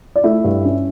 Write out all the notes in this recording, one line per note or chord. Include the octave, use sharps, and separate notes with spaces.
D5
A3 E4 E5
G2
C#4